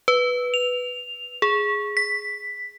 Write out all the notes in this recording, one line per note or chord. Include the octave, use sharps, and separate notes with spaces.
B4
F7
G#4
B6